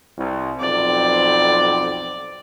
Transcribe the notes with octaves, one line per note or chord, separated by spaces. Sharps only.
C2
B1 F2 C4 D5